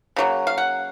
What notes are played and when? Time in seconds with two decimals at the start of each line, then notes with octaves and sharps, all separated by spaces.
0.16 C#3 F#3 A#3
0.47 F5
0.58 F#5